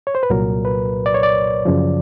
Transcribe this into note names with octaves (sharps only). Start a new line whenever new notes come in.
C#5
C5
B4
C2 A#2 F#3 A#4
B4
D5
C#5
D5
F#2 C#3 F3